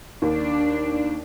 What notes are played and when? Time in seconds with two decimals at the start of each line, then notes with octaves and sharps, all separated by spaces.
0.22 D#2 D4